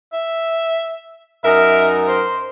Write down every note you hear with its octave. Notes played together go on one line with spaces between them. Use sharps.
E5
F#2 D#4 A#4 E5
C5